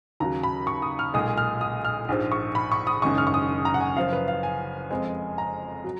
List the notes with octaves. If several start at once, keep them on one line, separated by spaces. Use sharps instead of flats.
D#2 C#3 F#3 A#5
B5
C#6
D#6
F6
B1 A#2 G#3 D#6
F6
D#6
F6
A#1 G#2 F3
C#6
B5
C#6
D#6
F#1 F#2 D#3 G#3 C#6
F6
C#6
D#6
A#5
F#5
G#5
F#1 F#2 F3 F5
B4
F5
G#5
F2 F3 G#3
A#5
F#3